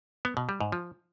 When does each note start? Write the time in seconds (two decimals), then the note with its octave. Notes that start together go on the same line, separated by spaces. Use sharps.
0.25 B3
0.37 B2
0.49 G3
0.61 G#2
0.72 F3